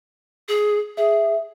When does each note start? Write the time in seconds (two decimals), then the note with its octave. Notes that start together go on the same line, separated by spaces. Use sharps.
0.48 G#4
0.97 G#4 E5